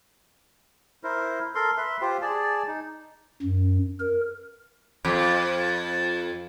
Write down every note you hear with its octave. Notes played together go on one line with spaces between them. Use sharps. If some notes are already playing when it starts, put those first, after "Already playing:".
E4 A#4 C5
A4 A#4 C6
B4 E5 C6
F4 G4 C5
G#4 D5 A5
D#4
F#2
A#4
F2